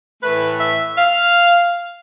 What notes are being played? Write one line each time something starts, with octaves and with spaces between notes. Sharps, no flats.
A2 E3 A3 B4
E5
F5